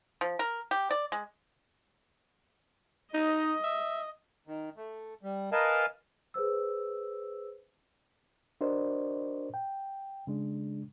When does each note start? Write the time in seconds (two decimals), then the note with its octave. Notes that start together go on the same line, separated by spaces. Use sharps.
0.21 F3
0.39 A#4
0.71 G4
0.91 D5
1.12 G#3
3.14 D#4 D#5
3.64 E5
4.47 D#3
4.77 A3
5.23 G3
5.52 A#4 B4 D#5 F5 G#5 A5
6.34 G#4 B4 C5 E6
8.61 D4 F#4 A#4 C5 D5 D#5
9.54 G5
10.27 C#3 G#3 D4